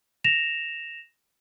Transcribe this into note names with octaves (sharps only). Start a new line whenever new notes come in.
A#6 E7 F7